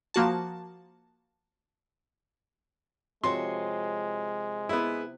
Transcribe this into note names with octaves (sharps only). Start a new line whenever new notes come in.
F3 A#3 F#4 A5
C3 F3 G#3 F#4 A4 C#5 C6
B3 E4 G#4